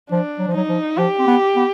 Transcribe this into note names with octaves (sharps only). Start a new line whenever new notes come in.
F3 D4
F#3
F3
F#3 D#4
F3
F3 G4
C4
B3
B3